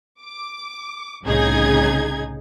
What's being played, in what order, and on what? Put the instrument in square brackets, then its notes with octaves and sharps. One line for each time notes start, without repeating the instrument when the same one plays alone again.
[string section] D6
C2 A2 C#3 D#4 G#4 G#6